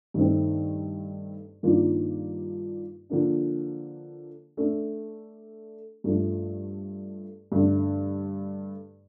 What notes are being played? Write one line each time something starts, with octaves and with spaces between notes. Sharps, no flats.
G2 D#3 A3 C4
G2 D#3 A#3 D4 F4
D3 F3 A#3 D4
A3 D4 A4
G2 F3 A3 D4
G2 D3 A3 D4